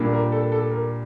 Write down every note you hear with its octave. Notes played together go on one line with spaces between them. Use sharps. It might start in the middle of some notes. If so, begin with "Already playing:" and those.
Already playing: A#2 G3 A#3 D4
A#4
A4
A4
A#4